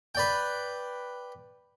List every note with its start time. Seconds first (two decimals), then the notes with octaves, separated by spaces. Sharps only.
0.15 B4 D5 G5